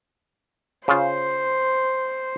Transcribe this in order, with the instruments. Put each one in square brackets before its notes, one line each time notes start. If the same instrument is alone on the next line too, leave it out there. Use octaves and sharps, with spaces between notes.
[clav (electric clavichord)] C#3 F4 [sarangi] C5